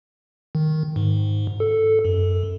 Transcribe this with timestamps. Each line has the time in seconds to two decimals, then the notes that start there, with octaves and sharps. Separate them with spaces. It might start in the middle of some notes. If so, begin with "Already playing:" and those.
0.55 D#3
0.96 G#2
1.60 A4
2.05 F#2